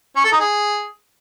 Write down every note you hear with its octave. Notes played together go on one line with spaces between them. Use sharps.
C#4
A4
D#4
G#4